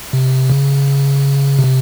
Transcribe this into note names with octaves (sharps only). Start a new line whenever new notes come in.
C3
C#3
C3